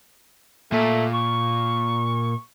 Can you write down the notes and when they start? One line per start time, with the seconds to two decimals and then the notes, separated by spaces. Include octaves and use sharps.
0.72 A#2 A3
1.14 C#6